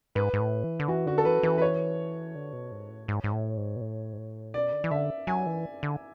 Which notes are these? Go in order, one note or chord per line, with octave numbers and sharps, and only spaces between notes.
G#2 B4
G#2
A2
E3
D3
E3 F#4
D3 F#4
A4
E3 B4
E3 B4
B4
C#5
D3
B2
G#2
A2
G#2
G#2
A2
G#2
B2
A2
G#2
A2
B2 D5
D3
E3
D3 E5
F#3 G#5
E3
D3